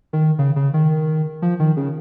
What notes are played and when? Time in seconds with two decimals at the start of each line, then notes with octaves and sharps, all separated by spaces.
0.13 D#3
0.39 C#3
0.56 C#3
0.74 D#3
1.42 F3
1.60 D#3
1.77 C#3